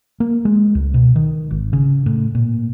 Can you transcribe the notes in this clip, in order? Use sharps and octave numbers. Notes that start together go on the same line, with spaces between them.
A#3
G#3
C#2
B2
D#3
G#1
C#3
A2
A#2